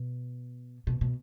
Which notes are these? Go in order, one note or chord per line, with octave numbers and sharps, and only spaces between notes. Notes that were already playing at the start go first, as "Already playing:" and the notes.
Already playing: B2
B2
B2